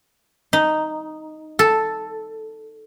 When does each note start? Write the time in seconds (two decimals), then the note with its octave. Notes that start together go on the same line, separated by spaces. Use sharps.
0.53 D#4
1.59 A4